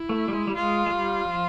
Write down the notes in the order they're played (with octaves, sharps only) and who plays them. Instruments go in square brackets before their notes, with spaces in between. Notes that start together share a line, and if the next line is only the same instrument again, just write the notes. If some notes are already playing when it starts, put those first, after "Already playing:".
Already playing: [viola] E4
[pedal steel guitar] A3
G3
G#3
G3
[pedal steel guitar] G#3 [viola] F4
[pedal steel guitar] G#3
G3
F3